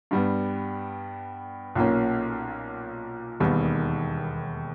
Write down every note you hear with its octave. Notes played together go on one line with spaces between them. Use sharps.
G2 G3 B3
B1 A#2 A#3 C#4
E1 D#2 D#3 G3 B3